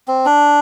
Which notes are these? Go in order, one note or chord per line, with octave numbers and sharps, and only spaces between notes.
C4
D4